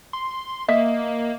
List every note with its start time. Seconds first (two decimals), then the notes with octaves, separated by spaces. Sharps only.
0.13 C6
0.68 A#3 D#5 E5